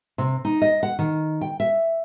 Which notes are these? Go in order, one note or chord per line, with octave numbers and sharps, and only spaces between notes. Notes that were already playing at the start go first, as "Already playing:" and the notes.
C3
D#4
D#5
F#5
D#3
G5
E5